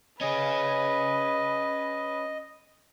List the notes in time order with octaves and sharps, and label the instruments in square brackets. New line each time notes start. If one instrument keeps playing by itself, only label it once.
[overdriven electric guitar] C#4 G#4 [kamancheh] B4 [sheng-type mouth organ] D#5